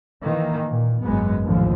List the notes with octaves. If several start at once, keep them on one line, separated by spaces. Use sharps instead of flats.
D#3 E3 A#3
A#2
G#1 F#2 G#3 B3
A#1 D#2 A2 D3 F3